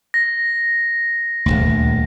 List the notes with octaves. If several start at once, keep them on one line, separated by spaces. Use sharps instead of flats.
A#6
D#1 G#1 D2